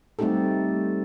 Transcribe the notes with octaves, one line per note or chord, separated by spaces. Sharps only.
G3 A3 C4 D#4 G4 A4